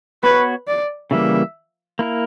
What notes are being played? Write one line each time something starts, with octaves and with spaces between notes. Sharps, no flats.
B3 F#4 B4 C#5
D5
C#3 E3 G3 A#3 E5
A#3 E4 A#4